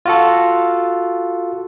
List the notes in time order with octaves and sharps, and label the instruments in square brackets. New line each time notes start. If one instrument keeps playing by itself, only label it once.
[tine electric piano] F4 F#4 A4